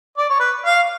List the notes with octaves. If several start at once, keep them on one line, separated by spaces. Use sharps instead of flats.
D5
C#5
B4
F5